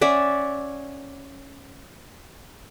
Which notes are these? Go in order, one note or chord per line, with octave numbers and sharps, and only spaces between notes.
C#4 D5 E5 F#5